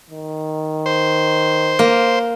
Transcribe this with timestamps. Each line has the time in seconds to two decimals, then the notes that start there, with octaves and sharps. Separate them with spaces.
0.10 D#3
0.86 C5
1.79 A#3